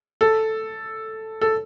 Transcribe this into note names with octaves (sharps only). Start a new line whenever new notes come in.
A4
A4